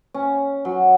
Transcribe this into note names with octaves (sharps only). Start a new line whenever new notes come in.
C#4
F#3